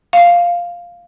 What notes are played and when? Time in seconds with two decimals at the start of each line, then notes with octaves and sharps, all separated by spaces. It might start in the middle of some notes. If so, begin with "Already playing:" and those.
0.13 F5